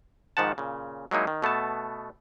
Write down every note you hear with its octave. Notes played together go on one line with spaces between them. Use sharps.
G#2 D#3 F3 F#5 A5
A#2 C#3
F#3 G#3 A#3 D#4 E4
D#3
B2 A3 B3 A5